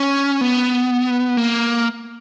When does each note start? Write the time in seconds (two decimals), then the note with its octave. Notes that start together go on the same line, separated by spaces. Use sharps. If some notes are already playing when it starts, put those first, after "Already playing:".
Already playing: C#4
0.41 B3
1.37 A#3